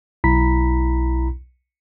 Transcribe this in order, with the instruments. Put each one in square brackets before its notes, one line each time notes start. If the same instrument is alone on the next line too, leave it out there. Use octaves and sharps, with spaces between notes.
[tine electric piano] B1 E4 A#5 B5 B6